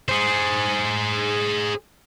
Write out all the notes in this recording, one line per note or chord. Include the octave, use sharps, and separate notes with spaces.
G#4 C5